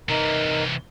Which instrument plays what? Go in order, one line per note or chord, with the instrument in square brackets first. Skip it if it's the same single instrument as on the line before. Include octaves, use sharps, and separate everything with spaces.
[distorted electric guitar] C3 E3 [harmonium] D#4 A#4